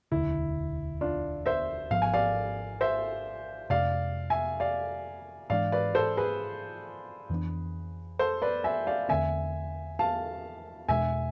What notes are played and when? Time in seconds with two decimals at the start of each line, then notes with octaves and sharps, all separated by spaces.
0.12 E1 D2 D3 E4
1.01 D4 F4
1.46 C5 E5
1.91 G#1 G#2 F3 B3 F5
2.02 G#5
2.14 D5 F5
2.81 C5 E5
3.70 F2 C3 G#3 D4 D5 F5
4.30 E5 G#5
4.60 D5 F5
5.50 G#2 E3 G#3 D4 D5 F5
5.72 B4 D5
5.95 A4 C5
6.17 G#4 B4
7.30 F2 E3 B3 D4
8.19 A4 C5
8.42 B4 D5
8.64 E5 G#5
8.87 D5 F5
9.09 E2 D3 A3 C4 E5 G#5
9.99 F5 A5
10.88 E2 B2 G#3 D4 E5 G#5